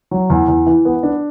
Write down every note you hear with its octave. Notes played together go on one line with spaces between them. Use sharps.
F#3
E2
E2
E3
B3
D4